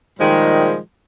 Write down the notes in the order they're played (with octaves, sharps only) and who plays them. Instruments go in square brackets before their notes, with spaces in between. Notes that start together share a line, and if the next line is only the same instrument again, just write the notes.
[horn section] A#2 D#3 F3 G3 G#3